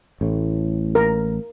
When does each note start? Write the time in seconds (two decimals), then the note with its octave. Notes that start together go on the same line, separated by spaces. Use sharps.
0.21 A1 A2
0.95 A#4